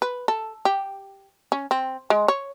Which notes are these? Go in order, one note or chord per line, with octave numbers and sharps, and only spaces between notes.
B4
A4
G4
C#4
C4
G#3
C#5